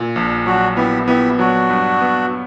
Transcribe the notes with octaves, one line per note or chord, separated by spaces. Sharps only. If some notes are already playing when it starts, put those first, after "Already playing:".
Already playing: A#2
A#1 D4
F#3 D4 F#4
B3 E4 G4
B3 E4 G4
F#3 D4 F#4
G2
B3